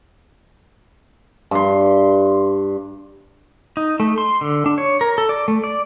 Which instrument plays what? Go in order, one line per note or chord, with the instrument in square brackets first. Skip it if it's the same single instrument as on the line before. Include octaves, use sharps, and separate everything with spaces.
[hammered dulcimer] G2 C6
[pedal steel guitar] D#4
A3
C6
D3
D4
C#5
A#4
A4
D5
A3
D5